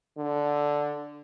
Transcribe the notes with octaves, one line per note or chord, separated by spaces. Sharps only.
D3